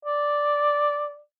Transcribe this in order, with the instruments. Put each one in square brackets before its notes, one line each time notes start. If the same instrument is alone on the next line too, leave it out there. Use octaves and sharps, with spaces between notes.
[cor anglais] D5